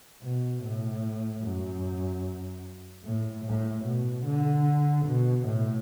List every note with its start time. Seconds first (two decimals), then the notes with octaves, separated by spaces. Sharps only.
0.22 B2
0.63 A2
1.43 F#2
3.05 A2
3.45 A2
3.85 B2
4.25 D3
5.06 B2
5.47 A2